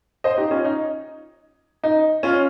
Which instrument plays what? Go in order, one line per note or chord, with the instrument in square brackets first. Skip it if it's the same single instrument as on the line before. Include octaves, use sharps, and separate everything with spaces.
[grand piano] C5 D#5
D#4 G4
C#4 F4
D#4
D#4
C#4 F4